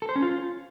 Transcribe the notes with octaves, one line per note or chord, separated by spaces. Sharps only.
A4
C5
C#4
F4